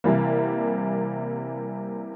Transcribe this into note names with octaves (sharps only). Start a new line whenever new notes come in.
C3 E3 G3 A#3